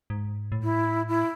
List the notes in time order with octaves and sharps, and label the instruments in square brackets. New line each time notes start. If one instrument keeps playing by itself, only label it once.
[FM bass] G#2
A2
[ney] E4
E4